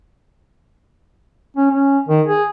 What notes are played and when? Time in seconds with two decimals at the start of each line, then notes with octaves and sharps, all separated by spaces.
1.57 C#4
1.71 C#4
2.09 D#3
2.27 G#4